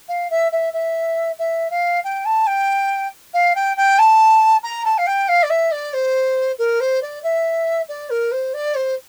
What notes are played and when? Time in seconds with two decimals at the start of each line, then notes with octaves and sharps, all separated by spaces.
0.08 F5
0.30 E5
0.51 E5
0.73 E5
1.38 E5
1.70 F5
2.03 G5
2.25 A5
2.46 G5
3.33 F5
3.55 G5
3.76 G5
3.98 A5
4.63 A#5
4.85 A5
4.97 F5
5.06 G5
5.28 F5
5.42 D5
5.49 E5
5.71 D5
5.93 C5
6.58 A#4
6.80 C5
7.01 D5
7.23 E5
7.88 D5
8.09 A#4
8.31 C5
8.53 D5
8.75 C5